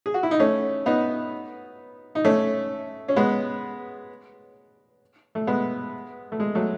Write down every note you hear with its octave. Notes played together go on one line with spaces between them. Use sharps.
G#4
F#4
E4
D#4
A3 C#4
B3 D#4
D#4
A3 C#4
C#4
G#3 B3
A3
G#3 B3
A3
G#3
F#3 A3